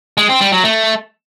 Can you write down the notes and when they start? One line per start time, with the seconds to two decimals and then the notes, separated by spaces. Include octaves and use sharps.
0.18 G#3
0.29 C4
0.41 G3
0.52 F#3
0.64 A3